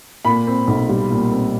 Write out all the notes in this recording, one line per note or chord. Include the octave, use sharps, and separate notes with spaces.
A#2 B5
C4
B1
G3
A#2
C4